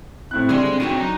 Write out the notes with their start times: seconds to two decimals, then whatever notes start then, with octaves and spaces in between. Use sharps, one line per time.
0.31 A2 C4 E4 F#6
0.49 D3 G3 G#3 G#4 C6
0.66 C4
0.80 A2 C4 D4 D#4 F#4 C#5 D#7
1.00 F#3 D#4